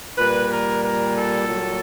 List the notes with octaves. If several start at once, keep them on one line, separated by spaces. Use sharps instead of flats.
A#2 G3 B4
A#4
A#4
A4
A#2 F#3